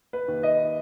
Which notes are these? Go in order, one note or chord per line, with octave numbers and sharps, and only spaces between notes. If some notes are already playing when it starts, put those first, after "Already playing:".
B4
D#2
D#5